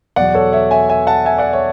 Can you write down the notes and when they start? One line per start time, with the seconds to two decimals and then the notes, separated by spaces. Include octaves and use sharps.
0.16 E2 B2 F#3 D5 F#5
0.34 A4 C#5
0.53 C#5 E5
0.71 E5 G#5
0.89 E5 G#5
1.07 F#5 A5
1.25 E5 G#5
1.38 D5 F#5
1.53 C#5 E5